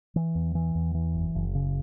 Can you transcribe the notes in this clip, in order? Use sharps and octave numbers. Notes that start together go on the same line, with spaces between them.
E3
E2
E3
E2
E3
F#1
F#1
C#3